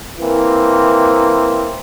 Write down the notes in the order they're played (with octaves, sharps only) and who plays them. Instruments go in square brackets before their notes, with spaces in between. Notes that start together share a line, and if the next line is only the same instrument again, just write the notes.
[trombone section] E3 A#3 C4